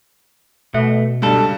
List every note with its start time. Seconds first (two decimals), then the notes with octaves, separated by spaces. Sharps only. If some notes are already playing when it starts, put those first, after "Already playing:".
0.74 B2 A3 E5
1.22 C#2 G2 G3 A4